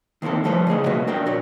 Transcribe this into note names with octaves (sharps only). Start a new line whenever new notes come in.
D#3 A#3 C4 E4 A4
F3 G3 A3 A4 B4 C5
A2 C#3 G#4 D#5
C2 A3 A#3 C#4 F#4 B4
D4 A#4 D5 G5
A#2 F#4 C#5